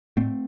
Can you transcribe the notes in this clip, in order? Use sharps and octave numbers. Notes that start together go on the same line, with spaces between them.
A2 A3 C4